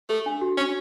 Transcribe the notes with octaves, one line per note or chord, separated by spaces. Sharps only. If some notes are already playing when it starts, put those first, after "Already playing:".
A3 A4
D4
F#4
C#4 D4